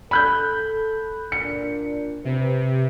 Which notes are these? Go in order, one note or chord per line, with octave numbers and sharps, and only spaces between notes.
A4 B5 F#6 G6
A#2 D4 C#7
C3 B4 C5